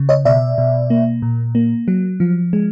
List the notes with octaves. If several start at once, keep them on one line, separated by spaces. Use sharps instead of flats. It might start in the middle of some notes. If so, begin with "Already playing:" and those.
Already playing: C#3
C#5 D#5
B2 D5 E5
B2
A#3
A#2
A#3
F#3
F3
G#3